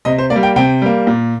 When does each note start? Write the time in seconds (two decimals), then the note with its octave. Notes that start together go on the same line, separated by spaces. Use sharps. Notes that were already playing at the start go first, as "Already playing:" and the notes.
0.05 C3 D#5
0.18 C5
0.30 A#3 D5
0.36 G3
0.43 G5
0.56 C3 G5
0.82 G3 A#3
1.07 A#2